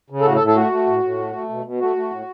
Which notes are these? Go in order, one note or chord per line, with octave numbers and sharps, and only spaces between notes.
C#3
A4
A2 F#4
A4
A2
A4
A3 F#4
A3
A2
A2
A3
A3
B2
B2
A3 F#4
A3
A2